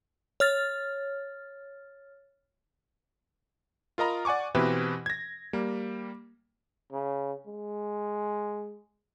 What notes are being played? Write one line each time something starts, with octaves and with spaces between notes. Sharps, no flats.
C#5 F6 A6
F4 A#4 D#5 A#5 B5
D5 F#5 G#5 C#6 D6
B2 E3 C4 E4 G4 B4
G#6 A#6
G3 A#3
C#3
G#3